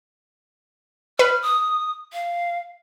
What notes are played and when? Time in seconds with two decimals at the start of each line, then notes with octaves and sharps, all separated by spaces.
1.19 B4 F6
1.42 D#6
2.13 F5